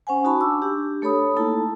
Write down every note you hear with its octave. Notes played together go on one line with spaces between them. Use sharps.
C#4 C5 F#5 G#5
D#4 F#4 G#5 A5 B5 C#6
D4 D6 E6
D4 G4
A3 A4 C#5 B5 D#6
A#3 D#4 E4 A4 A5